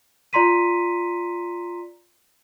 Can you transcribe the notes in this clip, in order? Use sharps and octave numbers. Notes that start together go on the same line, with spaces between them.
F4 D5 A#5 C6 B6 D#7